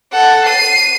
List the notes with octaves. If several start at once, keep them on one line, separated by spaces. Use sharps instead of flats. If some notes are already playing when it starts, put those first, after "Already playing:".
A4 F#5
C7 D#7